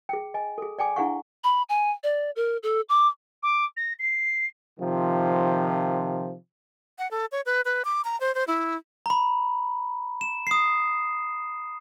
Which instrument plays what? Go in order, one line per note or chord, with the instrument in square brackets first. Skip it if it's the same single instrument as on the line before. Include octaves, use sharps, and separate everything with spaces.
[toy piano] G#4 G5
D#5 G#5
G#4 A4
D5 G5 G#5 D6
D4 E4 G#4 F5 F#5 C#6
[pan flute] B5
G#5
D5
A#4
A4
D6
[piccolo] D6
A#6
C7
[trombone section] C3 D#3 F3
[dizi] F#5
A4
C#5
B4
B4
D6
A#5
C5
C5
E4
[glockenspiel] A#5 B5
E7
D#6 C7